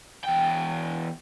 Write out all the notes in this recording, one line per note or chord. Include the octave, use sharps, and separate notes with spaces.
E2 G5